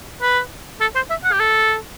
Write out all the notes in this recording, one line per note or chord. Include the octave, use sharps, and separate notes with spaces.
B4
A4
C5
E5
F#5
G4
A4